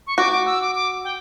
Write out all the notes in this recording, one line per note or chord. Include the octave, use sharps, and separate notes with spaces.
C#6
F#4 D6
D6
E6
D6
D6
G5